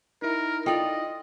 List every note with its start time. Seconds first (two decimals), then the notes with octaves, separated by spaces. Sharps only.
0.22 D#4 E4 A#4
0.66 F4 A4 D5 D#5 F5 G5